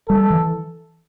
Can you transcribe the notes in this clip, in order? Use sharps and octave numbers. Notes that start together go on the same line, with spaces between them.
G3 A4
E3